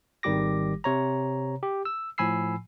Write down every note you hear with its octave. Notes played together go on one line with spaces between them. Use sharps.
G#1 D#3 G3 G4 D6 A#6
C3 C#5 A#5
G4
E6
A2 F3 G#5 B5 E6 C7